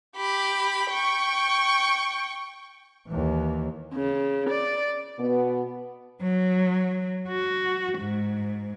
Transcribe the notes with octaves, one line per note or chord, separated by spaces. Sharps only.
G4 B5
G5 C#6
D#2 E3
C#3
D5
B2 B3
F#3
F#4
G#2